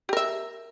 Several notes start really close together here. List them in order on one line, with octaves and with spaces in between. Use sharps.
G4 A#4 E5